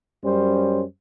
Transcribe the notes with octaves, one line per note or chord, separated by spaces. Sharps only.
F#2 G3 C#4 C5